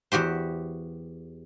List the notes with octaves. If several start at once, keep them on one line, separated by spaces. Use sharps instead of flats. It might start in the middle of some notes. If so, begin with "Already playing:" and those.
E2 F#4 G4 C5